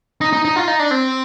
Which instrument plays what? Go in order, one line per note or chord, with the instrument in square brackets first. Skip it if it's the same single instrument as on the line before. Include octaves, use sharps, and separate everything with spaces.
[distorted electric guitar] D#4
D#4
D#4
F4
D#4
D4
C4